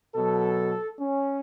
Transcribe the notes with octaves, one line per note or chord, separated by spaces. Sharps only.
B2 F#3 A4
C#4